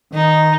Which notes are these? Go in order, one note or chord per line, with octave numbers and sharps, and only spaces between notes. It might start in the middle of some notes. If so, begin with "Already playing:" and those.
D#3 D#4